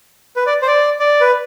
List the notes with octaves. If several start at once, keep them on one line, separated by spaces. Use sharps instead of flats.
B4
D5
C5
D5
D5
B4